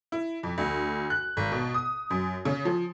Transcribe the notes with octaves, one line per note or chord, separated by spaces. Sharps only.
E4
F2
D2
F#6
G#1
B2
D#6
F#2
C#3
F3